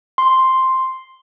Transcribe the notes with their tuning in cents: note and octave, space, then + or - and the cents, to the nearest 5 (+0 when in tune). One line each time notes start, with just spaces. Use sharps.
C6 +0